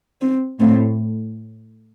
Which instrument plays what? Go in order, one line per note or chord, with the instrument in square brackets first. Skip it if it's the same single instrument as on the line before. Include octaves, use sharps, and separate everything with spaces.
[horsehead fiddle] C4
[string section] A2 [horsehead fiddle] C4